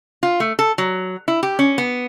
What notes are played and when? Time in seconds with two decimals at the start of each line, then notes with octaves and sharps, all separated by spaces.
0.23 F4
0.40 A3
0.59 A4
0.78 F#3
1.28 E4
1.43 G4
1.59 C#4
1.78 B3